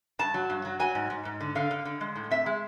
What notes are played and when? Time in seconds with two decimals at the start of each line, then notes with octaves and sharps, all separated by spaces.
0.19 G2 A5
0.34 F#3
0.50 G2
0.65 F#3
0.80 F#3 G#5
0.95 G#2
1.10 G#2
1.25 G#2
1.41 D3
1.55 D3 F5
1.71 D3
1.85 D3
2.01 G#3
2.16 A2
2.31 C4 E5
2.46 G#3